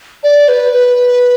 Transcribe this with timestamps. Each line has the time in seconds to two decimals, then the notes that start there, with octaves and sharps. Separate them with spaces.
0.23 D5
0.48 B4
0.73 B4